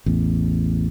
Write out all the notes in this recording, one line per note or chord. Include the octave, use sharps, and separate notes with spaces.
A1 E2